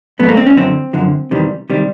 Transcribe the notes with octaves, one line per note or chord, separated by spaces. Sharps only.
G#2 F3 A3 B3
A#3
C4
C#4
F#2 D3 F3 C4
F#2 D3 F3
E2 C3 D#3 G3
C3 D#3 G3